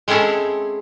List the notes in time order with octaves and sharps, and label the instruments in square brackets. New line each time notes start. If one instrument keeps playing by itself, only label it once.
[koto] G#3 C4 C#4 E4 G#4 A4